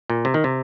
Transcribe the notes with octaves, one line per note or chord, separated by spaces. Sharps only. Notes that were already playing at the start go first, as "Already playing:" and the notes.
A#2
C3
D#3
C3